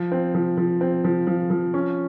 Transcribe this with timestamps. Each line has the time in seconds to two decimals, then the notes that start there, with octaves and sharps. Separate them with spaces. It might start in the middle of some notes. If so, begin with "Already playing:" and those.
Already playing: F3
0.12 C4
0.35 F3
0.57 F3
0.81 C4
1.04 F3
1.27 F3
1.50 F3
1.74 C#4